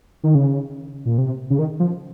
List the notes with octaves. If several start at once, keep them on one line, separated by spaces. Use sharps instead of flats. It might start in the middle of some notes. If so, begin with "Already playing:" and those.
D#3
C#3
A#2
C3
C#3
D#3
F3